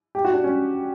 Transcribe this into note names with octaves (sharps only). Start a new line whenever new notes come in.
G4
F#4
D4
C#4